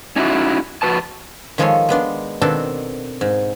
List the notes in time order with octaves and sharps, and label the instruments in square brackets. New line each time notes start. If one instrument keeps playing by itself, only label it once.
[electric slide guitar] C#4 D#4 E4 F#4
F2 F#4 B4 A5
[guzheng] D#3 F3 G#3 G#4 A4 C#5
G#3 B3 D4 C6
B2 D#3 C4 D4 A4
G#2